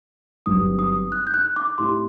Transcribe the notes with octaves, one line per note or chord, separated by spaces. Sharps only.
G1 G2 F#3 C4 D#4 D#6
D#6
F#6
G6
F#6
D6
A2 A3 C4 D#4 G4 C6